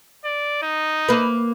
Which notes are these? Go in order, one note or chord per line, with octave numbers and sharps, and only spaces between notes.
D5
D#4
A#3 B4